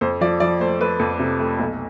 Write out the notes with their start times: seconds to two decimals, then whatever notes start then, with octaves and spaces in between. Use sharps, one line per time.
0.01 F2 C5
0.21 F3 D5
0.40 F3 D5
0.60 A3 C5
0.80 A3 B4
1.00 F2
1.19 C3
1.40 A3
1.59 B1